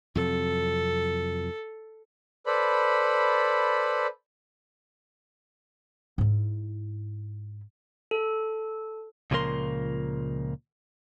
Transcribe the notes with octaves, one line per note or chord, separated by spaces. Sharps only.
F2 C3 F#3 A4
A4 B4 C5 D5 B5
G#2 E4
A4
C#2 A#2 C#3 F3 A#4 C6